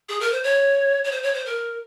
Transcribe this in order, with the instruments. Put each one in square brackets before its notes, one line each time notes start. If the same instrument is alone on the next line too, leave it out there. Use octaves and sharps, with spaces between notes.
[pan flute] G#4
A#4
C5
C#5
C#5
C5
C#5
C5
A#4